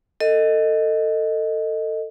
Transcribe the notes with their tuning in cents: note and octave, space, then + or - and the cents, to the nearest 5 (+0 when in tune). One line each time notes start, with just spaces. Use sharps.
A4 +25 D#5 +0